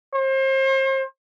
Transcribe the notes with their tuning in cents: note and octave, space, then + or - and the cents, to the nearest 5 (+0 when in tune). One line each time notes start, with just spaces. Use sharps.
C5 +35